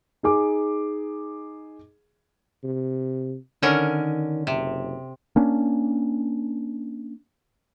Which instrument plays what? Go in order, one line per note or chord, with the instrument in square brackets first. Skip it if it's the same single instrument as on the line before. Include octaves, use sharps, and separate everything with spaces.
[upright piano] D#4 G#4 D6
[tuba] C3
[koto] D3 C#4 A#4 [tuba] D#3
[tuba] F#1 [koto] C3
[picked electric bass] A#3 C#4 D4